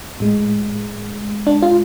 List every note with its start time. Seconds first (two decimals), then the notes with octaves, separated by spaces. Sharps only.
0.20 A2 G#3
1.47 D4
1.62 F4